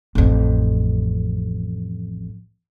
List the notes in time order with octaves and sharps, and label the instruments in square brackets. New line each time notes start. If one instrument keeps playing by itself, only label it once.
[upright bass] A1 F2